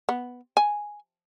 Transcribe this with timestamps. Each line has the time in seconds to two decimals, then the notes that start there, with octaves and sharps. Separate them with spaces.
0.09 B3
0.57 G#5